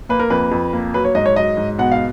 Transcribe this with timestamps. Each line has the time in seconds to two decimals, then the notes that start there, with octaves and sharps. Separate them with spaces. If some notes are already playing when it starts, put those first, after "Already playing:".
0.09 A#3 B4
0.20 A#4
0.30 F2 B4
0.51 F2
0.73 A#3
0.94 F#3 B4
1.05 C#5
1.15 G#2 D#5
1.26 C#5
1.36 F#3 D#5
1.57 G#2
1.78 B2 F#5
1.92 F5